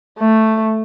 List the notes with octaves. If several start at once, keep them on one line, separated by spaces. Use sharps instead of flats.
A3